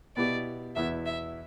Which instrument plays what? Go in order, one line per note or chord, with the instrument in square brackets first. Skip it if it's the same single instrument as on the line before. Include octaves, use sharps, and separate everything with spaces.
[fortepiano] B2 B3 E4 G4 [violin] D5
[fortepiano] E2 B2 B3 E4 [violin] E5
[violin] E5